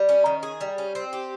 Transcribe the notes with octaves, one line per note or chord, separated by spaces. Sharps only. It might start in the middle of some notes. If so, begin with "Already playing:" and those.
Already playing: G3
C#4
D#3
G#4
G3
C#4
C4
G4